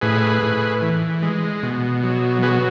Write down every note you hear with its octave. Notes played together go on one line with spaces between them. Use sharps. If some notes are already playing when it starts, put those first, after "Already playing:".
A2 G#4 B4
A2
E3
G#3
B2
F#3
F#3 G#4 B4